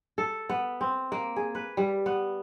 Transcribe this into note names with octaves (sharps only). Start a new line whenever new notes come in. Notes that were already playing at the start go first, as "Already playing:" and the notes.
A4
B3
C4
A#3
G#4
B4
G3
B3